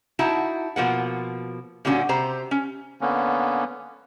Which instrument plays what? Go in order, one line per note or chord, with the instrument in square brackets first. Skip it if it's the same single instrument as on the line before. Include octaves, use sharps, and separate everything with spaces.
[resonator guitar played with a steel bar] D#4 E4 F#4 E5 A5
B2 F3 A#3 F#5
A#2 D3 G3 C#4 F#4
C3 G4 C5 A#5
C#4
[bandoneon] D3 A#3 B3 C#4